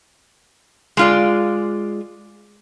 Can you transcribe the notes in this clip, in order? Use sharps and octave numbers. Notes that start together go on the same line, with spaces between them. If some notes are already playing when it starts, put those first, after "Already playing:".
G#3 F4 D5